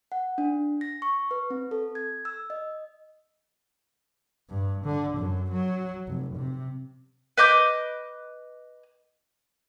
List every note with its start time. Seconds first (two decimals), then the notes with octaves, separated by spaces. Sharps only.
0.12 F#5
0.38 D4
0.81 A#6
1.02 C#6
1.31 B4
1.50 C4
1.71 A4
1.95 G#6
2.25 E6
2.50 D#5
4.50 G2
4.85 D3
5.17 F#2
5.52 F#3
6.07 F1
6.36 C3
7.38 B4 D#5 D6 G6